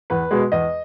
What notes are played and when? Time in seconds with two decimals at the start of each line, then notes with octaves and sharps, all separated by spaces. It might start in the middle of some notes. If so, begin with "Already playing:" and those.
0.10 E2 B4
0.31 B2 G#3
0.52 E2 D#5